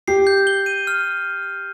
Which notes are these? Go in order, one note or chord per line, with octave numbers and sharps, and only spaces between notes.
G4 C7
G6
G7
D#7
F6